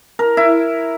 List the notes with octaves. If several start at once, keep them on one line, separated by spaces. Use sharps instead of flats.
A#4
E4